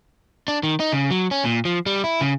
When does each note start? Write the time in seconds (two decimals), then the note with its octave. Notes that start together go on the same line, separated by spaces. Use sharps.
0.48 D4
0.63 D#3
0.80 D#4
0.92 C#3
1.11 F#3
1.31 C#4
1.45 A#2
1.65 F3
1.86 G3
2.04 E4
2.21 C#3